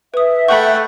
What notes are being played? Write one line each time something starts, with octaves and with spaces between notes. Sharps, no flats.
B4 E5 D#6
A3 F#5 G5 B5 C#6